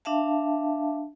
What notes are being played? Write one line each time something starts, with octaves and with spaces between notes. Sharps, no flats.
D4 E5 F5 A5